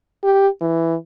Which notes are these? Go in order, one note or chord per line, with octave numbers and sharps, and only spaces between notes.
G4
E3